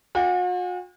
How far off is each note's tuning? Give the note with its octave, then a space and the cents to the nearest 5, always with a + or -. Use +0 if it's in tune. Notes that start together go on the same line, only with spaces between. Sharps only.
F#4 -45 G5 +45